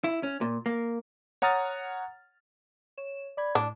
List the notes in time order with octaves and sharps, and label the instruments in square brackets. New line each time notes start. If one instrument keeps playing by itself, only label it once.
[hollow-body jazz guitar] E4
C#4
A#2
A#3
[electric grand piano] C#5 F#5 A#5 D#6 F6 A6
[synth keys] C#5 E7
D5 B5 G#6
[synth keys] A2 [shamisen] D4